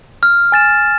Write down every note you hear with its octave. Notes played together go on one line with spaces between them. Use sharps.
F6
G#5 A6 E7